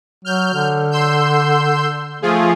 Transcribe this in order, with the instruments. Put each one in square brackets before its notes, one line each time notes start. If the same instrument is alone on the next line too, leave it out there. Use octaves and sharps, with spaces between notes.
[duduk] F#3 [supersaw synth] F6 G6
[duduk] D3
[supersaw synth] C6 E6 G6
[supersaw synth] F3 F4 G#4 [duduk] A3